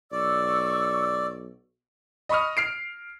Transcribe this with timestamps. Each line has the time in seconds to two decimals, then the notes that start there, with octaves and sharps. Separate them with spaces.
0.12 B1 D5 C#6 E6
2.29 D#5 B5 C#6 D#6 F6
2.57 F6 C7 D7